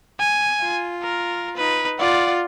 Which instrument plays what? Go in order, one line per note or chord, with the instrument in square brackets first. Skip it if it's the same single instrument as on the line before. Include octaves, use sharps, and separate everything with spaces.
[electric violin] G#5
[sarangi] F4
[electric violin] A#4
D#4 B4
[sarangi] F4 [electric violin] D5 F#5